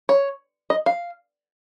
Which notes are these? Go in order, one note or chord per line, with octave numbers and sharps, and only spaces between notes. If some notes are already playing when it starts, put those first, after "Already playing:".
C#5
D#5
F5